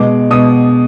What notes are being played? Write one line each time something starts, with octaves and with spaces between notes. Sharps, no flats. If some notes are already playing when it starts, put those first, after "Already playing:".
Already playing: B2 G#3 D6
B2 G#3 D#6